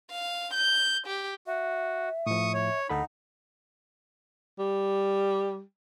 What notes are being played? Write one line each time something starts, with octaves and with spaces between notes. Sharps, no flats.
F5
G6
G4
F#4 E5
A2 F3 C#6 D#6
C#5
D2 D#4 A4 F#5 B5
G3